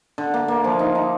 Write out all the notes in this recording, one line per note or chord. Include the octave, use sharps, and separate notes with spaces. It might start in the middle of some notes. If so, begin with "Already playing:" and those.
D3
A#3
A#3
F3
D#4
D#4